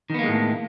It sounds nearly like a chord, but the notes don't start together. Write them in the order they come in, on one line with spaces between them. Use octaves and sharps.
D#3 B3 A#3 G#3 A2